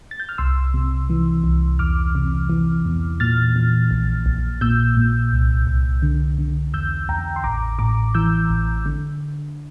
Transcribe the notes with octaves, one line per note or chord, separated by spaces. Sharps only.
A6
G6
F6
C2 C6 E6
C3
E3
C2
E2 D6 F6
C3
E3
E2
A#2 F6 A6
A#2
A#1
A#1
A#2 E6 G6
A#2
C2
C2
D3
D3
E2 E6 G6
E2 G5 A#5
C6
A1 A#5 D6
A2 A#5 D6
E3 E6 G6
A1
D3